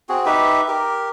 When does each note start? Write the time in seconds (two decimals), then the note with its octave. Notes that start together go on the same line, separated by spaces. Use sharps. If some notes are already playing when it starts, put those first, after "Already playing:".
0.09 C4 F#4 G#4
0.26 D#4 G4 B4 E5
0.68 G4 A#4